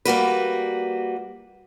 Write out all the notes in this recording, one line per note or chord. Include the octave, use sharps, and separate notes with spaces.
G3 A#3 F#4 B4